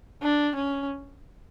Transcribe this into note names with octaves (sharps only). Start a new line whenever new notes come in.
D4
C#4